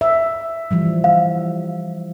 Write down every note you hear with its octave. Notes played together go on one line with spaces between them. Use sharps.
E5
E3 F3 G3
F5